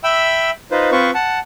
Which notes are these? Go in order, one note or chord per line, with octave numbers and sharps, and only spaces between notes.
E5 G5 B5 E6
D#4 F4 B4 C5
C4 F4 B4 C5 C#6
F#5 A5